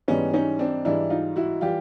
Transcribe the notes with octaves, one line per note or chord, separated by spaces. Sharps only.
G#2 E3 G3 B3 C#4
C#4 D#4
C4 D4
G#2 E3 G3 D4 E4
D#4 F4
E4 F#4
E3 G3 F4 G4